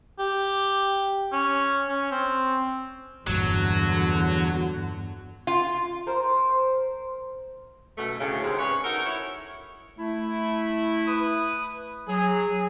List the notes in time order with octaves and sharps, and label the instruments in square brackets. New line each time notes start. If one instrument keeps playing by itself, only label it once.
[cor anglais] G4
C#4
C#4
C4
[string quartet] E2 D3 [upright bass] G2 A#2 [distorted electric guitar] F#3
[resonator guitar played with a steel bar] F4
[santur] A#4 C5
[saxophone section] F#2 B2 A3
D2 A2 C#3
G#2 C3 D#3 G#3 C4
C#4 B4 C#5
D#4 F#4 A4 A#4
E4 C#5
[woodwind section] A3 E4
[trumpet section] B4 D#6
[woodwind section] F#3 [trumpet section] G#4